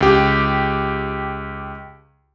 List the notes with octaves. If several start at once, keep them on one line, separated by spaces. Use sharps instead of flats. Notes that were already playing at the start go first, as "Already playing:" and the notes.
C#2 G4